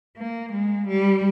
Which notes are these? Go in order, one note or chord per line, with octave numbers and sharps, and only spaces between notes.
A#3
G#3
G3